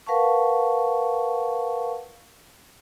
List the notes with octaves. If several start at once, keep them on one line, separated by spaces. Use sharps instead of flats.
A#4 B4 F5 F#5 A5 C#6